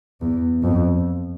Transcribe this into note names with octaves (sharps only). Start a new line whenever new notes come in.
E2
F2